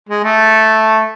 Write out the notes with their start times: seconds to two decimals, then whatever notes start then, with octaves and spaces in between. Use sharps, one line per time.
0.09 G#3
0.24 A3